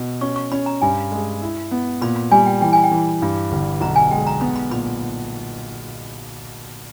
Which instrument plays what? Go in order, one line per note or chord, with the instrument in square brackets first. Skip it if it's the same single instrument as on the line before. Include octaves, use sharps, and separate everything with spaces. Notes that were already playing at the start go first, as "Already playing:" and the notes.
Already playing: [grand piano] B2
[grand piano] C#4 [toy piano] C#6
[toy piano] C#6
[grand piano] C#4 [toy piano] B5
[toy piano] A#5
[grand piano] G2 [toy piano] G#5
[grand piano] G#3
E4
B3
[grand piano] A#2 [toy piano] B5
[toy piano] B5
[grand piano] G3 [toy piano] G#5
[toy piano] G5
[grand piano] E3 [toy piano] G5
[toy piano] G#5
G5
[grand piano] E3
G2
G1
[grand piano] B1 [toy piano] A#5
[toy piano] G#5
[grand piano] G#3 [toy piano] G5
[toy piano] A#5
[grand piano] B3 [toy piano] B5
[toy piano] B5
[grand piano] A#2 [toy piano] B5